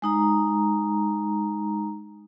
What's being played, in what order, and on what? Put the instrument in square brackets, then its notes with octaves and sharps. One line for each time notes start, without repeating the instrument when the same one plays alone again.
[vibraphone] G#3 D#4 A#5